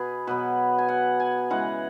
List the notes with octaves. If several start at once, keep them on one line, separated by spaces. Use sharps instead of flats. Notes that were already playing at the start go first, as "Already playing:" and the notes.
Already playing: B2 B3 G#4 B4
B2 F#3 B3 B4
G#5
F#5
G#5
C#3 E3 G#3 F#5